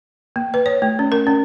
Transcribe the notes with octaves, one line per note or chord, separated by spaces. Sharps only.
A#3
B4
C#5
A3
C#4
A#4
C#4